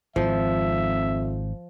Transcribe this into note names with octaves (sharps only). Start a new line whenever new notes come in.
G#1 F2 G#2 F3 E5